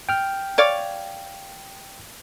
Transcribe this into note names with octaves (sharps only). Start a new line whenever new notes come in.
G5 F6
C#5 D5 F5